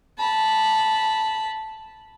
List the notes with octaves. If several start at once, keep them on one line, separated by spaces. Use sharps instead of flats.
A5 B5